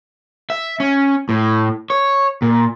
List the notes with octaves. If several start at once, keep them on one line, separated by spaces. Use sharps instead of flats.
E5
C#4
A2
C#5
A#2